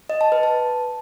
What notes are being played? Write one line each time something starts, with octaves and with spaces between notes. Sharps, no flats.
D#5
A5
B4
A5